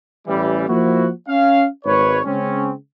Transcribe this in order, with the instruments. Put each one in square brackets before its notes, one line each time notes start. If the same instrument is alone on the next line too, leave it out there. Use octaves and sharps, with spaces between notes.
[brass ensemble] A1 E3 G3
F3 A#3 E4 F#4
C#4 F5
G#1 G#2 B4 C#5
C#3 G#3 C4 C#4